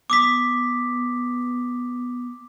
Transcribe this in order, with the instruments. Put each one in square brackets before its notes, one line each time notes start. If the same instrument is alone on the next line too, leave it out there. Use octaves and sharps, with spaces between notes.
[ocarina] B3 [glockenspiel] D6 D#6 B6